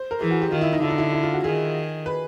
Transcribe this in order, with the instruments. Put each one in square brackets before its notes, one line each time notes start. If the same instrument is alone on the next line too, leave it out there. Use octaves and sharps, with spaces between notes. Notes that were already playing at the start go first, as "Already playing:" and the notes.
Already playing: [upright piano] C5
A#4
[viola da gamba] E3 [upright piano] G#4
[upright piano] F#4
G4
[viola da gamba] D#3 [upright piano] F4
[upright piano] E4
D#4
[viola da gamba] D3 [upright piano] E4
[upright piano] D#4
E4
E4
F4
F#4
[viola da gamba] D#3 [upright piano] G#4
[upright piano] B4